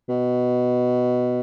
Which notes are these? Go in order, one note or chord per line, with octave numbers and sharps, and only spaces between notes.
B2